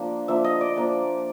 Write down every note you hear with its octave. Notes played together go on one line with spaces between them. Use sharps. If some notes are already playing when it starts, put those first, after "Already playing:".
Already playing: F3 A#3 D4
F3 A#3 D4 E5
D#5
D5
F3 A#3 D4